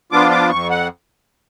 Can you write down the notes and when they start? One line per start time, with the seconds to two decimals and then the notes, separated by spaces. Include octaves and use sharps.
0.12 F3 B3 D4 F4 D6
0.31 D6
0.50 F2 C#6
0.70 F#5